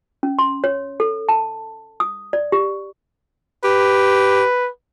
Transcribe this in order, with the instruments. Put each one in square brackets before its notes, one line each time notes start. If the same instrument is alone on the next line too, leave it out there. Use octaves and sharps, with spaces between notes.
[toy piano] C#4
C6
C#5
A4
A5
D#6
D5
G4
[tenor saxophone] G4 [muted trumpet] B4